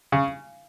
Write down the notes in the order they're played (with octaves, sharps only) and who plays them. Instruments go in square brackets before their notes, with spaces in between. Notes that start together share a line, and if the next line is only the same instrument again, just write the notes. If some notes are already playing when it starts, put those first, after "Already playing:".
[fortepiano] C#3